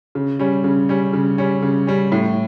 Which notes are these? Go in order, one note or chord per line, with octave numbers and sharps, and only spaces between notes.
C#3
G3 C#4
C#3
G3 C#4
C#3
G3 C#4
C#3
G3 C#4
A2